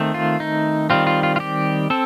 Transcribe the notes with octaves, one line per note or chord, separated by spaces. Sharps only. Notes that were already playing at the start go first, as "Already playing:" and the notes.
Already playing: D#3 A3 C4
F4
D#4
D#3 G3 C4 F4
F4
F4
F4
G4
C4 A4